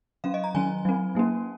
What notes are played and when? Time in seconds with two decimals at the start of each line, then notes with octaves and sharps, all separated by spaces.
0.24 F#3 C#4 F5
0.34 D#5
0.44 A#5
0.54 D#3 F#3 C#4 G#5
0.85 F#3 C4
1.15 F#3 A#3 C#4